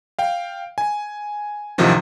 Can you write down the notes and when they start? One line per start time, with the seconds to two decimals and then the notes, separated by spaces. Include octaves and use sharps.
0.19 F5 G5
0.78 G#5
1.78 D2 A2 C3 D#3 F3 F#3